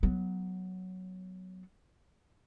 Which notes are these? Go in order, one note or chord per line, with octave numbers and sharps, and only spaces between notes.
F#3 B3